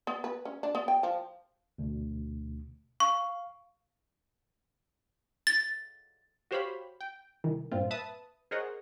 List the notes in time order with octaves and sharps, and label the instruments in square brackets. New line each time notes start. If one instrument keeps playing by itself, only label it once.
[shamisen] B3
B4
C#4
D4
B3
G5
F3
[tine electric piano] D2 B2
[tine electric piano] F5 [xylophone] C#6
[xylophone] A6
[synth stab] F#4 G4 C5 C#5 F5 B5
G5
C2 D#3 E3
G2 A#2 C4 F4
B4 E5 A5 D#6
G#4 A#4 C5 C#5 D#5 F#5